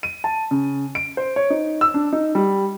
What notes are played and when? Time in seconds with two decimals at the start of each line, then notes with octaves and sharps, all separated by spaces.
0.03 D#7
0.24 A5
0.51 C#3
0.95 D7
1.17 C5
1.36 C#5
1.50 D#4
1.81 E6
1.94 D4
2.13 D#4
2.35 G3